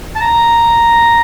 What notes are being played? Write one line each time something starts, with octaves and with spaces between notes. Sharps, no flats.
A5
A#5